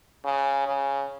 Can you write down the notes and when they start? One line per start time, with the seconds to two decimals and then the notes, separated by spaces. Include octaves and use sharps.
0.24 C#3
0.67 C#3